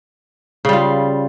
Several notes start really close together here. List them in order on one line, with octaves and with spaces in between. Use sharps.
C#3 G3 F4